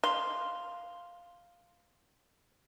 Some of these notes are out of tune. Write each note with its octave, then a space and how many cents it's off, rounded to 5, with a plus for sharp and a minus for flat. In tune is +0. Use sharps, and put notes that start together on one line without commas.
F5 +0 C6 +0